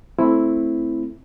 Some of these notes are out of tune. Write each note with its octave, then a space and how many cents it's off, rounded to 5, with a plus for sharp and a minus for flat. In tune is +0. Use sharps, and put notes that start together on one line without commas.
A3 +0 C4 +0 E4 +0